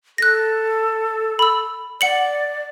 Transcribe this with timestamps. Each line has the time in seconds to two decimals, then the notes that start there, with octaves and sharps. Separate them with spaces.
0.18 A4 F#6 A#6
1.39 B5 E6
2.01 D5 F#5 C#7 F#7